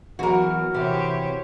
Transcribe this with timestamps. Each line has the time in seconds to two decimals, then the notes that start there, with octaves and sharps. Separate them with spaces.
0.19 E2 E3 F#3 F#4 A#4
0.74 C3 E3 G4 C5 C#5